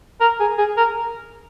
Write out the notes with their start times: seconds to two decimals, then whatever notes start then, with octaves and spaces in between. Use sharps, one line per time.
0.21 A#4
0.40 G#4
0.58 G#4
0.77 A#4